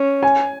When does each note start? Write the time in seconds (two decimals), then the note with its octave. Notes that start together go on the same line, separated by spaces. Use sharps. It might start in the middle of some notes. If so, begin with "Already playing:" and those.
Already playing: C#4
0.23 G#5